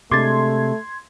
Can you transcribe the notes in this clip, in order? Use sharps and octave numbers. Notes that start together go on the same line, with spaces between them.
C3 G#3 A3 D4 C6 D6 G#6 A6